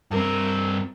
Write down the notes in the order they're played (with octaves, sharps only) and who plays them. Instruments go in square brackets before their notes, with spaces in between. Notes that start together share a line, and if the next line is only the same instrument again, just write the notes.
[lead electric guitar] G2 C4 [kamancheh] A#4